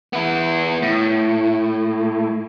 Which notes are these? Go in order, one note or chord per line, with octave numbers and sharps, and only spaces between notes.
B3 E4
A2